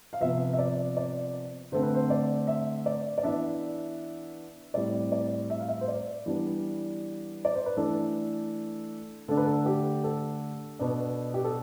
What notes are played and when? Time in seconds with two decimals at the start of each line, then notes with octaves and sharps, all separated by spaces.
0.13 F5
0.21 C3 F3 B3 E5
0.53 E5
0.59 D5
0.97 D5
1.72 D3 A3 C4 C5
1.83 B4
1.95 C5
2.10 D5
2.47 E5
2.86 D5
3.18 D5
3.23 E3 B3 D4 E5
4.74 A2 G3 C4 D5
5.12 D5
5.50 E5
5.60 F5
5.68 E5
5.81 C5
5.88 D5
6.26 E3 G3 B3 D4
7.45 D5
7.55 C5
7.66 B4
7.77 E3 A3 D4 A4
9.28 D3 A3 D4 A4
9.37 B4
9.46 A4
9.66 G4
10.04 A4
10.79 B2 B3 D4
11.34 G4
11.44 A4